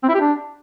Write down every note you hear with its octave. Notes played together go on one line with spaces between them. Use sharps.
C4
E4
G4
D4